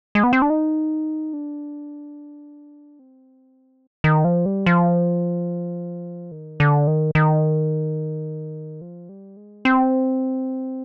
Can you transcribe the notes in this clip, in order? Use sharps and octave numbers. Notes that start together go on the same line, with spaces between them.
G#3
B3
C4
D4
D#4
D4
C4
D#3
F3
G3
F3
D#3
D3
D#3
D#3
F3
G3
G#3
C4